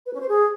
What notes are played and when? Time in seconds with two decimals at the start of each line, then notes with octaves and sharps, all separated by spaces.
0.05 B4
0.13 C#4
0.20 C5
0.28 G#4